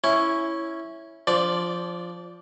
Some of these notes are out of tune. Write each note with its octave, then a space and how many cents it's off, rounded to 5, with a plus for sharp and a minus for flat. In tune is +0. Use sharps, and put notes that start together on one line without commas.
C#4 +0 E4 +0
F3 +0 D4 -20 D5 +0